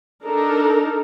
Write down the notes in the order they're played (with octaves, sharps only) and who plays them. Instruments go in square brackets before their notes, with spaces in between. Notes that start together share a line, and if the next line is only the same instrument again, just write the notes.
[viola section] D4 D#4 A4 A#4